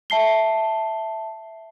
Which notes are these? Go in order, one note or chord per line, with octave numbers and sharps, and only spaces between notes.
E5 A5 C7 G7